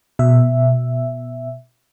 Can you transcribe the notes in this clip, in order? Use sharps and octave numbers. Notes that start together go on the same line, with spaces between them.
B2 E5